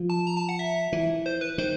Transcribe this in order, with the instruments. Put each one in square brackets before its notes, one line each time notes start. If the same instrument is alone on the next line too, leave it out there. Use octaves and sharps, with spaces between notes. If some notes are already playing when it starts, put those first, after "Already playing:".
Already playing: [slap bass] F3
[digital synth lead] A5
A#5
A5
F#5
E5
[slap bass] E3
[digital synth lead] C5
B4
[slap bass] D#3 [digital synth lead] C5